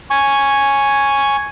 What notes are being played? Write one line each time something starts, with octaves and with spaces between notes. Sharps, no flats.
G#5 C#6